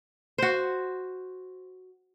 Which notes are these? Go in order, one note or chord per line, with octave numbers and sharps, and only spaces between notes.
F#4 C5